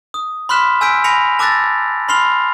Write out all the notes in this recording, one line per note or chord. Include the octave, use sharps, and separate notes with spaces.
D#6
B5 C6 F6 F#6 B6 E7
G#5 E6 G6 B6 D7
G#5 B5 A#6 C#7 F7
A5 D6 E6 F#6 A6 A#6
B5 C6 F6 C7 F7 G7